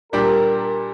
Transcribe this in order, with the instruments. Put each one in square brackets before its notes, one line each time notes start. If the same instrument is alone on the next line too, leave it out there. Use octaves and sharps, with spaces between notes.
[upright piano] A#2 G3 D4 G4 [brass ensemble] A#4